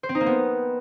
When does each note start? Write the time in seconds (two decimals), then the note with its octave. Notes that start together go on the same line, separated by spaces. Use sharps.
0.03 C5
0.09 C4
0.15 D#4
0.21 A#3
0.26 B3